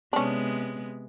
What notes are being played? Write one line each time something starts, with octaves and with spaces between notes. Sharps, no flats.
C3 G#3 B3 C#4 D4